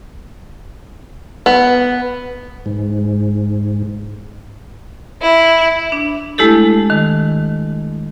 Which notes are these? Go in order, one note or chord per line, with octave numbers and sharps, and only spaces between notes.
B3
G#2
E4
D4
G#3 A3 E4 G4 A4
D#3